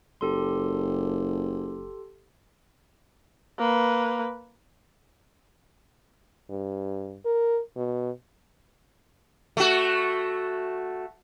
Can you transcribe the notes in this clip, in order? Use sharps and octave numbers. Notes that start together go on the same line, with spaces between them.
F#1 G4 A4 C6
A#3 B4
G2
A#4
B2
A3 F#4